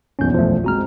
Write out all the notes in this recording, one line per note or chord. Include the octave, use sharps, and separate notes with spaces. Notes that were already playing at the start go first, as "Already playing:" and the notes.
F#1 B1 E2 C#4 G6
F3 A3
G#3 C4 F#4 A#5 F6